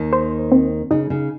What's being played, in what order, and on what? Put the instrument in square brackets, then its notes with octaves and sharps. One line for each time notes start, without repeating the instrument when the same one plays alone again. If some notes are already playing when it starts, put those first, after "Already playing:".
Already playing: [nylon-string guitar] D#2 D#3
[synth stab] C5
C4
[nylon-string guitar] C#3 [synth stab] D#4
[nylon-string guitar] C#3